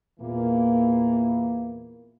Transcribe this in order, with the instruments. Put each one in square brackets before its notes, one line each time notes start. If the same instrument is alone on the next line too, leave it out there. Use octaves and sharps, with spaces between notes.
[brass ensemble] E2 A#2 E3 A#3